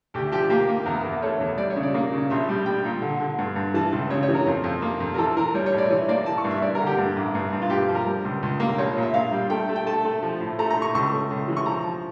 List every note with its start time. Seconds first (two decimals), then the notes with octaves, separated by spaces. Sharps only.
0.14 D2 G4
0.32 F3 G4
0.50 A#3 G4
0.68 A#3
0.86 E2 A#4
1.05 E2
1.22 A3 C#5
1.41 E2
1.58 G3 D5
1.70 C#5
1.76 C#3
1.83 D5
1.94 A#3
2.12 C#3
2.30 A#1 E5
2.49 G3
2.66 G3 G5
2.85 A#2
3.02 D3
3.20 D3
3.38 G2
3.56 G2
3.74 E3 A5
3.92 C#2
4.10 C#3 C#5
4.23 C#5
4.29 E3
4.34 A#4
4.47 F2
4.64 F2
4.82 A#3
5.00 F2
5.14 A#4
5.18 E3 A4
5.37 E3 A#4
5.54 G3 C#5
5.66 C#5
5.73 A2
5.78 D5
5.90 E3 C#5
6.08 A#3 D5
6.26 E3 A5
6.38 C#6
6.44 G2
6.51 E5
6.62 G2 D5
6.75 A#4
6.80 D3
6.87 G4
6.98 G2
7.16 A1
7.35 G2
7.52 G2
7.62 F4
7.70 G2 G4
7.88 F3
7.95 A#4
8.07 G3
8.25 C#2
8.42 C#2
8.60 A#3
8.78 A#1 C#5
8.97 A#2
9.02 E5
9.14 A#2 F5
9.32 G3
9.50 A3 G5
9.69 A3
9.76 G5
9.86 A3 A5
10.05 A3
10.23 F3
10.40 A2
10.59 A3 A#5
10.70 A#5
10.77 A2
10.82 C#6
10.94 C#2 C#6
11.12 A3
11.30 C#2
11.48 E3
11.56 C#6
11.66 F3 A#5
11.84 F3